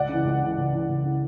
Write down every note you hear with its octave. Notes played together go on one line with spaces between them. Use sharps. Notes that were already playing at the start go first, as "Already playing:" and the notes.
Already playing: C#2 D5 F#5
C#3 E3
C#2
C#3 E3
C#2
C#3 E3
C#2
C#3 E3